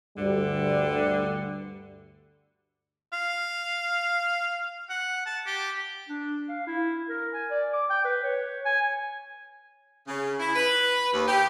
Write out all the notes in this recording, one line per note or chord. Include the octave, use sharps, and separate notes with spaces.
D2 G2 D3 G3
F5
F#5
A5
G4
D4
F5
E4
A#4
G#5
D5
D6
G5
B4
C#5
G#5
C#3
E4
B4
D#2
G4